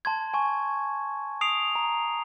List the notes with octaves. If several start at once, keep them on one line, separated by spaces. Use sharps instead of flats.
A5 C6 G#6
G#5 C#6
D#6 C7 D7 F7
A#5